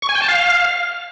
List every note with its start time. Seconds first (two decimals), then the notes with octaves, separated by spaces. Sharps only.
0.02 C#6
0.09 G#5
0.15 G5
0.22 A5
0.28 F5